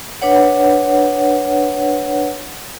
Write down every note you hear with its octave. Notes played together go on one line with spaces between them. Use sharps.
D4 B4 C#5 F#5